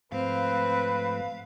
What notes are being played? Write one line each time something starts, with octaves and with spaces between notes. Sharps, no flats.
G#2 F3 A3 C4 B4 F5